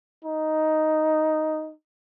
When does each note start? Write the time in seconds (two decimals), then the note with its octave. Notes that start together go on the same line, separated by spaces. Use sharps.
0.25 D#4